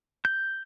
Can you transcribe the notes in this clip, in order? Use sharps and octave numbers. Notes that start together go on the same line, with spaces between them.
G6